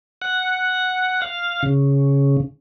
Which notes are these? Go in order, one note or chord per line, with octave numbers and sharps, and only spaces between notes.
F#5
F5
C#3